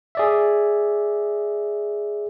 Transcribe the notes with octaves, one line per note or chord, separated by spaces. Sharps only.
G#4 D5 E5